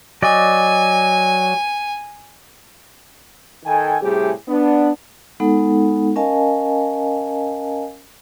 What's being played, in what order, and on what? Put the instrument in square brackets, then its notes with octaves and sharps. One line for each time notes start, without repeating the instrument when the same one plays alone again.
[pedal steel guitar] F#3 D5 D#5 [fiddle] G#5
[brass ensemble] D#3 A4 G5 G#5
A2 C3 G3 G4 G#4
B3 D4
[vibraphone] G#3 B3 D#4 A4 F#5
C#4 A#4 D#5 F5 G#5 A5